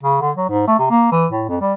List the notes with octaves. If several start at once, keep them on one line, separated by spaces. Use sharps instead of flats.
C#3
D3
F#3
G#2
A3
C3
A#3
E3
A2
F2
G3